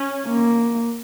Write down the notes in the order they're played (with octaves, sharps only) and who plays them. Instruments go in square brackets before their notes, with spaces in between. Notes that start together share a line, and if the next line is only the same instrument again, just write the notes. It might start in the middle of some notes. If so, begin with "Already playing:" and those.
Already playing: [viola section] C#4
[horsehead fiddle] A#3